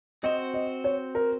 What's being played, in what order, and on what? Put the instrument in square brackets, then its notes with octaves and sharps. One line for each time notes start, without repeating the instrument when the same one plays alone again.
[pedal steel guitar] C4 F#4 C5 [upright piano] D#5
[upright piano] D#5
C#5
A#4